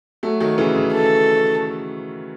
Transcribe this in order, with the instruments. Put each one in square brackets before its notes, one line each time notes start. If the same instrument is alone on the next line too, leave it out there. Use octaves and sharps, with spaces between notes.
[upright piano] F#3 A3
D#3 F#3
C#3 E3
C#3
[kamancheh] A4